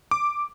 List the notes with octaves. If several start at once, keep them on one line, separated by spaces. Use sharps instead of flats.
D6